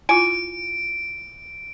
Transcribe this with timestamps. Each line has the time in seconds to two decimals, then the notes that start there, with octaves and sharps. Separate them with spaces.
0.09 E4 F4 G#5 D7